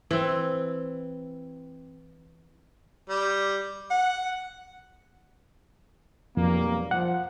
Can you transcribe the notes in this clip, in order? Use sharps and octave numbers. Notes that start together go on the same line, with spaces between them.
E3 C4
G3
F#5
B1 F2 G3 A#3
F3 F#5